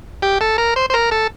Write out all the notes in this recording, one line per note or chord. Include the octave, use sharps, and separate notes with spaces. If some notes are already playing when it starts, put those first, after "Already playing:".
G4
A4
A#4
C5
C5
A#4
A4